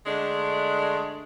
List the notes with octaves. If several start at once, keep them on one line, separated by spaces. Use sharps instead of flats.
D3 G#3 A3 D4